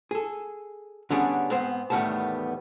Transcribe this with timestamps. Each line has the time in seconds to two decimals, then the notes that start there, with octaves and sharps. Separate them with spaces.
0.11 G#4 A4
1.10 D3 G3 B3 C#4 D4 G#4
1.50 G#2 B3 C4 C5
1.90 E2 A2 D#3 G3 B3 A5